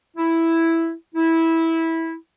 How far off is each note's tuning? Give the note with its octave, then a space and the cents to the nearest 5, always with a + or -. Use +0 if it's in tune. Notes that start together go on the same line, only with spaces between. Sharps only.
E4 +0
E4 -15